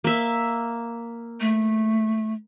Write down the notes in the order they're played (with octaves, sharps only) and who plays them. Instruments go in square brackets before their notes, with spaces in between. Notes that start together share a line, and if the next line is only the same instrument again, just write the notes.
[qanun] A#3 E5
[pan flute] A3